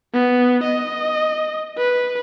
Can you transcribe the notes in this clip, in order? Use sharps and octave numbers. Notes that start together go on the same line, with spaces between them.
B3
D#5
B4